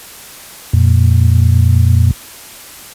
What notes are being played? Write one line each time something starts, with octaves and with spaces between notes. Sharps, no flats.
F2 A#2